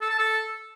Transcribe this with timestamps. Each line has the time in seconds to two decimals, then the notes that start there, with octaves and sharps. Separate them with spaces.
0.01 A4
0.10 A5
0.19 A4